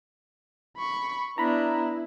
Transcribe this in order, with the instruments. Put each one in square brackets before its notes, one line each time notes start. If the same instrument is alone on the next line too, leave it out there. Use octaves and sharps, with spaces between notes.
[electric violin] B5 C#6
[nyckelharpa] B3 D4 [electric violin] E4 [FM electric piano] A#5 B5